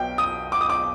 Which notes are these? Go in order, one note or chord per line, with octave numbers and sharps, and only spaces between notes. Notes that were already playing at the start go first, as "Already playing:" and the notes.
Already playing: B1 B2 G5
D#6
D6
D#6
D6